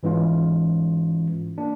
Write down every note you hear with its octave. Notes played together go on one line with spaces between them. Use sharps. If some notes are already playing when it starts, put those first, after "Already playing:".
G#2 E3 G#3 C#4 F4
A#3 D4